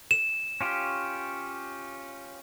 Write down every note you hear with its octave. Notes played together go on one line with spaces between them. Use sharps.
E7
C#4 F4 G4